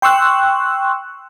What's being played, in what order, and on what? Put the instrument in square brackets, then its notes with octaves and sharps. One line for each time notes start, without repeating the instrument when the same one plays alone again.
[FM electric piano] G5 C6 C#6 E6 F#6